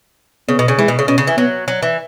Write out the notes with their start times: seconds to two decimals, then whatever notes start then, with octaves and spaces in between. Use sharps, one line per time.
0.49 C#3 B3
0.59 B2
0.68 C#3
0.78 E3 G#3
0.88 B2
0.99 C#3
1.08 B2 C#4
1.18 C#3
1.27 E3
1.37 F#3 B3
1.68 F#3
1.83 E3